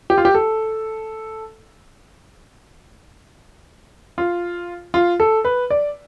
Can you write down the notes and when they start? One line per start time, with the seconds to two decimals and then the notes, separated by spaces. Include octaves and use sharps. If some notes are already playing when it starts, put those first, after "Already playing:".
0.10 G4
0.18 F4
0.25 G4
0.35 A4
4.18 F4
4.94 F4
5.20 A4
5.45 B4
5.70 D5